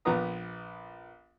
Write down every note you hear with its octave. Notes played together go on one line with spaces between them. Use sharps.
A#1 F3 B3 B4 A#5 D#6